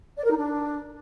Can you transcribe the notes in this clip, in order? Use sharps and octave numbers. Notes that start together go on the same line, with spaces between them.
D5
A#4
D#4
D4